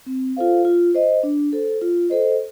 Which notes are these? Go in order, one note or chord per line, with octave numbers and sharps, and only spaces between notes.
C4
F4 A4 C5 F5
F4
C5 D#5
D4
A4 C5
F4
A4 C5 D#5